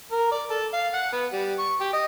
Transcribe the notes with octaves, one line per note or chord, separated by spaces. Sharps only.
A#4
D5
A4
F5
F#5
B3
G3
C#6
G4
D#5